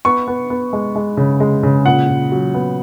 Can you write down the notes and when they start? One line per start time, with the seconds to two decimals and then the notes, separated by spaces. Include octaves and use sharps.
0.05 B3 C#6
0.28 B3
0.50 B3
0.73 G#3
0.96 G#3
1.17 C#3
1.40 G#3
1.63 C#3
1.86 A#2 F#5
2.09 A#2
2.32 F#3
2.54 B3